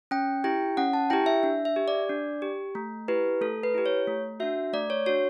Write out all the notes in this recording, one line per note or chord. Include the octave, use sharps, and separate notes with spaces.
C#4 G5
E4 G4 G5
C#4 F#5
A5
E4 G4 G5
E5
D4
E5
G4
D5
D4
G4
A3
E4 G4 B4
A3 A4
B4
E4 G4
C#5
A3
D4 F#4 E5
A3 D5
C#5
D4 F#4 C#5